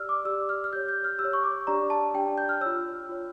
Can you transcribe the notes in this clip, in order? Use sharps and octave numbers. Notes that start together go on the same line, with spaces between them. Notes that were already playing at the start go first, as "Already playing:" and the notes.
Already playing: G4 D5 E6 F6
D6
G4 D5 E6
F6
F6
G4 C#5 G6
G6
F6
G4 E6
C#5
C#6
D6
D4 G4 D5 A#5
A5
D4 G4 D5 G5
G6
F6
F4 C#5 E6
F4 C#5